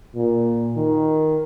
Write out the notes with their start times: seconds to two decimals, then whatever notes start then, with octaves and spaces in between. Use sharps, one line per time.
0.15 A#2
0.77 D#3